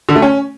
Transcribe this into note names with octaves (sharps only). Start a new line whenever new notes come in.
D3
A3
C#4